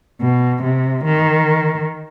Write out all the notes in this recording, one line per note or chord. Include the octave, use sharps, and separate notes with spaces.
B2
C3
D#3